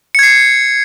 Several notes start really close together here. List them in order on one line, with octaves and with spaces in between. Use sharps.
C#7 G#6 C7